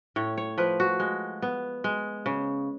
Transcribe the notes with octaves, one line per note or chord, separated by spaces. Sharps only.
A2 C#5
C#5
F3 B4
F#4
G#3
B3
G#3
C#3